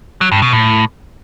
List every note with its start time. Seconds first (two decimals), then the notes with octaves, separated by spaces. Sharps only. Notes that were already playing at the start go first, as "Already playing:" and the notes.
0.21 F#3
0.32 G2
0.42 B2
0.53 A2